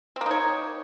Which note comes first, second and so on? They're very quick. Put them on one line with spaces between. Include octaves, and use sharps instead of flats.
C4 A#3 D#4 C#5